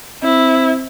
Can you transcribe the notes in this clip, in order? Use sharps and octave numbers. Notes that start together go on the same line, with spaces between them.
C4 E4